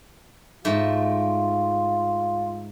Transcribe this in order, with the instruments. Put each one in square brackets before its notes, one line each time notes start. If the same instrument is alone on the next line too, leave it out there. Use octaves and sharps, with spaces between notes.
[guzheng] G#2 A3 [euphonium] F4